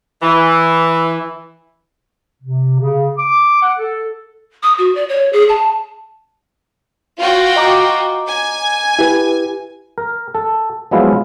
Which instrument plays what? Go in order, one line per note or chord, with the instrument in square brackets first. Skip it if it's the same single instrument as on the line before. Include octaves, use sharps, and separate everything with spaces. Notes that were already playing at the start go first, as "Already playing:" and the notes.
[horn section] E3
[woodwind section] C3
C#3
D6
F#5
A4
[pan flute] D#6
F#4
D5
C#5
G#4
A5
[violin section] F4 F#4 G5
[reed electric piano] D#5 A#5 D6
[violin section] G#5
[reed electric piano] E4 G4 B4
[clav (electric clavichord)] A#4
A4
F3 F#3 G#3 B3 E4 F4